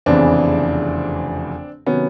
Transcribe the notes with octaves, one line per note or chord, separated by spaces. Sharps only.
F1 E2 C#3 E3 C4 D4
C3 D#3 F#3 B3 C#4